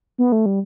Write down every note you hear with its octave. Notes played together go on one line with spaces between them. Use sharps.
B3
A3
G3